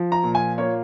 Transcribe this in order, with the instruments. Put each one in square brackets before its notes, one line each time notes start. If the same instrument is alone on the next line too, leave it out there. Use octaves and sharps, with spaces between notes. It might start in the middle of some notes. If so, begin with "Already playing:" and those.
Already playing: [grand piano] F3
A#5
A#2
G#5
A#3 C#5